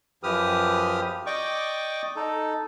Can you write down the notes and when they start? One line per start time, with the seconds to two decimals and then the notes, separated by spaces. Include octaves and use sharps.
0.23 F#2 F3 G4 B4 D#6 F6
1.26 D5 D#5 G5 C#6 D6
2.16 D#4 A4